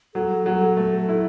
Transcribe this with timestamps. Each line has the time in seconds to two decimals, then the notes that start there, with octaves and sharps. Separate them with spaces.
0.14 F#3 A4
0.46 F#3
0.77 A3
1.09 E4